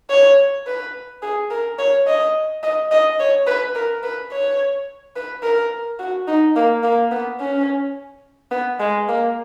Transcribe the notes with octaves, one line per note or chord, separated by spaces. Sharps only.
C#5
B4
G#4
A#4
C#5
D#5
D#5
D#5
C#5
B4
A#4
B4
C#5
B4
A#4
F#4
D#4
A#3
A#3
B3
C#4
B3
G#3
A#3